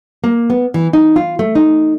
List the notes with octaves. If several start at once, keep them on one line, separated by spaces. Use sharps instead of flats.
A#3
B3
E3
D#4
F4
A3
D#4